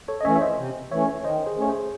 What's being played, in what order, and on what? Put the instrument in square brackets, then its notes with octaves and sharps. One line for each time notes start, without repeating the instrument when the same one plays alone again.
[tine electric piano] A4 C#5
D#5
[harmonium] E3 A3 C#4 [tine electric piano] C#5 E5
[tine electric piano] E5
C5 D#5
[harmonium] C3
[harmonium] E3 A3 C#4 [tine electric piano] C#5 E5
[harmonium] D#3 [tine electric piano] C5 D#5
[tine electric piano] G#4 C5
[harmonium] A3 C#4 [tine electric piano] C#5
[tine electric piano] G#4 C5